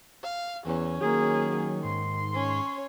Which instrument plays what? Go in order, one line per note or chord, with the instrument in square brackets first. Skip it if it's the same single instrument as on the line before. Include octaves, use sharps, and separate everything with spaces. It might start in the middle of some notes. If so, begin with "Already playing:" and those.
[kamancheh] F5
[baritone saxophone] E2 [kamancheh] C#4
[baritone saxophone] D#3 [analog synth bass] F#3 [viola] A#3 G#4
[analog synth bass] G#2 [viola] C6
[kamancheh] C#4 C#5